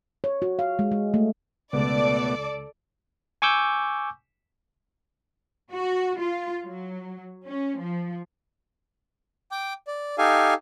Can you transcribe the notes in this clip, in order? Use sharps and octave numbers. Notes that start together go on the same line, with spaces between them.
C#5
F#4
F5
G#3
G#3
A3
C#2 B2 A3 B3 A4 D5
G#5 C#6 D6 E6 G6
F#4
F4
F#3
C#4
F3
G5 D6
D5
D#4 G4 A4 F5 G#5